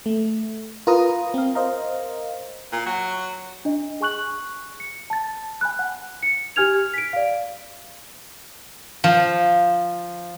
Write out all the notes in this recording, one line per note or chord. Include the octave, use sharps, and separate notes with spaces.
A3
F4 A#4 B4 A#5 D#6
C4 F5
A#4 C5 D#5 F5 A#5
A#2
F#3
D4 D#5
G#4 G#5 C#6 F#6 F#7
C#7
A5 A6
G#5 B5 F#6
F#5
C#7
G4 G#5 F6 G#6 F7
B6 D7
D5 F5
F3